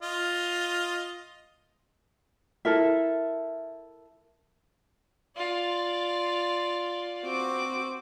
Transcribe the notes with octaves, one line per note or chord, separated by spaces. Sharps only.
F4 D#5
E4 A4 A#4 E5
F4 D5
C4 F#4 D6